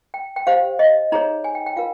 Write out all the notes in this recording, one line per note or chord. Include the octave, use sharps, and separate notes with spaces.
G5
G5
G4 C5 F5
D#5
D#4 G#4 C#5 A#5
G#5
G5
G5
F4 A#4 F5